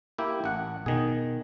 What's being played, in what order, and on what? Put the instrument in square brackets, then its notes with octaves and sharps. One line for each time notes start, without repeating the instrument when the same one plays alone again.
[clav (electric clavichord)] A#3 E4 G4
A1 F#5
[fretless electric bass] B2 [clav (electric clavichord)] D#3 G#4